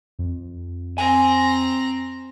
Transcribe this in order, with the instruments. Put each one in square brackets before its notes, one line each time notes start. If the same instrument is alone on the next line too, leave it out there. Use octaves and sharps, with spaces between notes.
[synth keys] F2
[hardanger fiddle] C4 A#5 [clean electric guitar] G#5